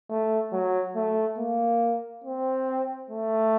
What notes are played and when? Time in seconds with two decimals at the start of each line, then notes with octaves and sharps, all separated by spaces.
0.10 A3
0.52 F#3
0.96 A3
1.38 A#3
2.24 C4
3.10 A3